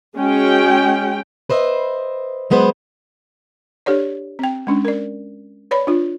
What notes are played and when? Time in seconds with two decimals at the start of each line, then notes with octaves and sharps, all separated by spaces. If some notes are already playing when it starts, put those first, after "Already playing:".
0.17 G#3 C#4 F#4 G5
1.50 B4 C5 D#5 E5
2.50 F#3 G#3 B3 B4 C5
3.86 D4 G4 A4 C#5 D5
4.39 C4 G5
4.67 G#3 C#4 D4
4.85 A#4 D5
5.71 B4 C#5 D5 B5
5.87 D4 F4